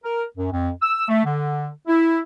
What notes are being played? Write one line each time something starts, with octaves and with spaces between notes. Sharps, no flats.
A#4
F#2
F2
E6
A3
D3
E4